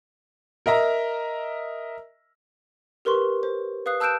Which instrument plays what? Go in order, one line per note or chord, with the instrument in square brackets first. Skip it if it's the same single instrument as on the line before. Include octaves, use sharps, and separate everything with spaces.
[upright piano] A#4 D#5 E5 A#5
[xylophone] G4 A#4 B4 C6 C#6
C5
B4 F5 D#6 F#6 C7
A5 E6 F#6 G6 D7 E7